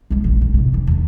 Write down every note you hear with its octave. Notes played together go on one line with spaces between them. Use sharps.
G#3 B3
A#1 D#2
C#4
A2 C3
D#2 E3
D#2 D4